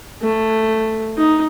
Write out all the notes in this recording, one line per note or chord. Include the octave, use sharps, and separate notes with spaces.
A3
D#4